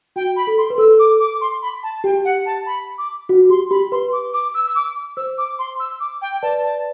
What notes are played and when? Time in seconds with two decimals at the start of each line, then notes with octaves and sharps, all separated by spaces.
0.16 F#4 G5
0.36 B5
0.47 A4
0.58 C6
0.70 B4
0.78 A4 E6
0.99 D6
1.20 D6
1.41 C6
1.62 B5
1.83 A5
2.04 G4 G5
2.24 F#5
2.46 A5
2.66 B5
2.98 D6
3.29 F#4
3.50 G4 C6
3.70 G4 B5
3.92 B4 C6
4.13 D6
4.33 D6
4.54 E6
4.68 E6
4.75 D6
5.17 C5 E6
5.38 D6
5.59 C6
5.79 E6
6.00 D6
6.21 G5
6.42 B4 D5 A5
6.63 A5